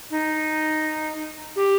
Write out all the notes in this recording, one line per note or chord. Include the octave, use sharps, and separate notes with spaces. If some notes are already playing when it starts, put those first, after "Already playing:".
D#4
G4